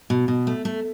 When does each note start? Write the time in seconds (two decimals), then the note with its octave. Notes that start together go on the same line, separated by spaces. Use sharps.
0.10 B2
0.28 B2
0.47 A3
0.65 A3